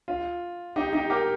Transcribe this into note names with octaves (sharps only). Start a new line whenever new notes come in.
F4
D#4 G4
D#4 G4
G4 A#4